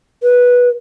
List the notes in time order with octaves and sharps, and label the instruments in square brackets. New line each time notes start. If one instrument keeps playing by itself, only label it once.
[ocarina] B4